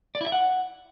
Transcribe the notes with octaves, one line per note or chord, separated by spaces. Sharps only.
D5
E4
E5
F#5